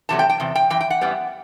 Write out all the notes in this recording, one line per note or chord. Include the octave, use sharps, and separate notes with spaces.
E2 C3 F#3 A3 A5
G5
G5
E2 C3
G5
F#2 E3 G5
G5
F#5
F#2 E3 G3 B3